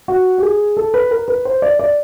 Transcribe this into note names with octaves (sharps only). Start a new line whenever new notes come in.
F#4
G4
G#4
A4
B4
A#4
B4
C5
D5
D5